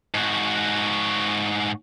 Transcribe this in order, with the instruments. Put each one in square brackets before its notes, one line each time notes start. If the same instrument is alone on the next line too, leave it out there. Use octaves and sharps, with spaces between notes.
[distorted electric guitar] G#2 F#4